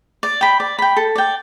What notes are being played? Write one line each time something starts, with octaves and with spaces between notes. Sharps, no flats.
D5
G5 B5
D5
G5 B5
A4
D5 G5